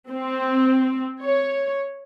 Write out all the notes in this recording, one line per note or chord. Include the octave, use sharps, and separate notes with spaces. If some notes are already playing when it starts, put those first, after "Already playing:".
C4
C#5